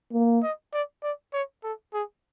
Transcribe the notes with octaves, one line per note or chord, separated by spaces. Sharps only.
A#3
D#5
D5
D5
C#5
A4
G#4